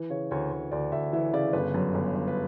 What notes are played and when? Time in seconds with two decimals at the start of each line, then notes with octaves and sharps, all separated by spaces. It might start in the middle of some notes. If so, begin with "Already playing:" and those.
Already playing: E3
0.10 C#3 C#5
0.31 D2 C#5
0.52 D2
0.71 D2 D5
0.92 D2 E5
1.13 E3 E5
1.33 C#3 D5
1.53 G1 B4
1.74 F#2
1.94 G1
2.14 G1
2.28 B4